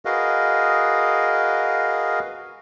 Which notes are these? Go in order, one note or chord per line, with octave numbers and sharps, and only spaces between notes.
F#4 G#4 A#4 B4 D#5 F5